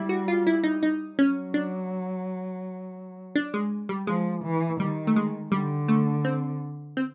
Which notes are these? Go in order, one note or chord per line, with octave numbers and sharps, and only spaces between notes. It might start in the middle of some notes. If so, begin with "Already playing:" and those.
Already playing: G3 E4
F#4
F4
E4
D#4
D#4
F#3 C#4
D4
D4
G#3
G3
F3 G#3
E3
D#3 G3
A3
G#3
D3 G3
A3
C4
C4